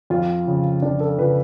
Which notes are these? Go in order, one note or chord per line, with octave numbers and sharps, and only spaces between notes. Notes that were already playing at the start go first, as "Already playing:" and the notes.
F2 F4
C#3 F3
F2 D4
A4
C#3 F3 B4